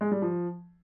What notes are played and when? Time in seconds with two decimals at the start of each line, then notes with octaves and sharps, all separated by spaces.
0.01 G#3
0.11 G3
0.22 F3